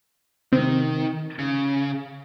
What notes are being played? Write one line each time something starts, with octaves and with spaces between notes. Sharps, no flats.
C3 D#3
C#3